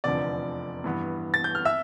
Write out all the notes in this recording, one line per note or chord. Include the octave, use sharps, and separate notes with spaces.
F1 E2 D3 F3 D5 D6
G2 E3 B3
A6
G6
F6
E5 E6